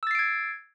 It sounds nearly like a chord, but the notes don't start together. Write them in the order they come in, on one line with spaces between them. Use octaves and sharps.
E6 A6 C7 D7 G#6